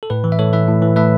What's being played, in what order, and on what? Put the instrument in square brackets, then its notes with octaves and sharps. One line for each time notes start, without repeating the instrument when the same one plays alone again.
[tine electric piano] A4
A2 B4
E3
E5
A2 A4 C#5
E3 B4 E5
A2
E3
A2 B4 E5